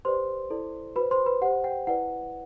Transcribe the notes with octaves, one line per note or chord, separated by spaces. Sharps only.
G4 B4 C5 D5 C6
E4 A4 D5
F#4 B4 C5 B5
C5 C6
B4 B5
G4 C5 F#5
G5
E4 B4 D5 F#5